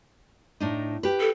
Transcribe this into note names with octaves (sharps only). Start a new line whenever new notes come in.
A2 D4 D#4
G4 B4
A4